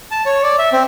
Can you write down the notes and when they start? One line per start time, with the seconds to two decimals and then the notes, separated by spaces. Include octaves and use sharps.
0.11 A5
0.26 C#5
0.43 D5
0.59 E5
0.73 C4